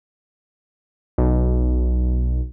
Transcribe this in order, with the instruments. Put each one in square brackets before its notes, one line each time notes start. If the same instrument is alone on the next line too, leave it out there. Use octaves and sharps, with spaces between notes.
[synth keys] B1